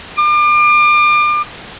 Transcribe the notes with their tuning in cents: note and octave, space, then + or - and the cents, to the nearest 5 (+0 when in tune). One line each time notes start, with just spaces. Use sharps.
D6 +35